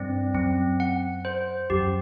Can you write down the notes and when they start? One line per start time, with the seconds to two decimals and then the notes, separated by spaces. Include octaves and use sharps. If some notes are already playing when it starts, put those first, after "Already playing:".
Already playing: G2 C4 D5
0.34 F#2 C4
0.80 F#5
1.25 C5
1.70 F#2 G4